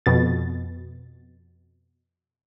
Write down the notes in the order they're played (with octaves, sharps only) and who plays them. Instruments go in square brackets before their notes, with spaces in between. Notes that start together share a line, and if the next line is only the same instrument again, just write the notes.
[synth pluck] F2 B2 A6